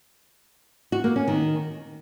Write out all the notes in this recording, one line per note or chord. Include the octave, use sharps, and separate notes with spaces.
F#4
A#3
C#4
D#3